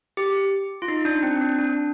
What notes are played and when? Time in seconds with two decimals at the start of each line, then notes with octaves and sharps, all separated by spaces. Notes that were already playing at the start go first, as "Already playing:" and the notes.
0.17 G4
0.82 F4
0.88 D#4
1.05 D4
1.23 C4
1.36 C4
1.41 D4
1.59 D4